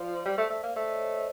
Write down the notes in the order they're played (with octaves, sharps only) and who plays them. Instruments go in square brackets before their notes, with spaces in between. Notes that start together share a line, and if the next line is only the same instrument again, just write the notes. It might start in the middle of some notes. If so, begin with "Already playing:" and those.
Already playing: [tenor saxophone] F3 [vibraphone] C5 D5
[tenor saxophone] G3
A3
A3
A#3
[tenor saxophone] A3 [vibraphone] C5 D5
[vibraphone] C#5 D#5
C5 D5
C#5 D#5